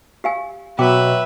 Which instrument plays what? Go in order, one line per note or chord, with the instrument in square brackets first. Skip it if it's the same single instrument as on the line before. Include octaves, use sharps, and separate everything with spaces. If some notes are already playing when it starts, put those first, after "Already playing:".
[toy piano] G4 F5 G#5
[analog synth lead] B2 [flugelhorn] F#3 [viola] B4 E5 [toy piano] G5 D6